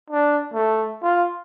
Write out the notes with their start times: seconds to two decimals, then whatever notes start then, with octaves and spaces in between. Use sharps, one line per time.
0.10 D4
0.54 A3
1.02 F4